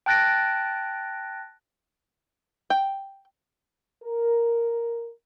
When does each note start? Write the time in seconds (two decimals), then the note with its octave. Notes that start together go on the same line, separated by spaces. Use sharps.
0.06 G5 A5 F#6 A6 A#6 D7
2.70 G5
4.04 A#4